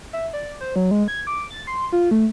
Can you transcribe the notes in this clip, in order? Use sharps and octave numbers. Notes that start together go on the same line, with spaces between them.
E5
D5
C5
F#3
G#3
G#6
D6
A6
C6
F4
A3